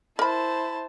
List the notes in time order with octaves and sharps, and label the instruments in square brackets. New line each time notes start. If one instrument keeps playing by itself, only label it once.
[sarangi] E4 [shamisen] A#4 B5 [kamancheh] C5 [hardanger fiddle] A5